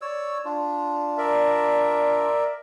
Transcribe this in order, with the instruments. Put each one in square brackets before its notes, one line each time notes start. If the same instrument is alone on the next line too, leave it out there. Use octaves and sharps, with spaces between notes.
[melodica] C#5 D5 E6
D4 F4
[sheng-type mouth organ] A#4 D5 E5